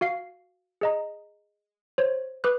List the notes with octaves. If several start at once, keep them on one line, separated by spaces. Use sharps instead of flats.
F#4 F5 C7
G#4 D#5 A#5
C5 C#5
B4 D6 D#6 F#6